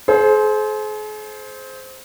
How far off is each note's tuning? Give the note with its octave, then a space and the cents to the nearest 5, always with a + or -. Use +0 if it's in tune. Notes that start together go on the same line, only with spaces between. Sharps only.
G#4 +45 C5 +0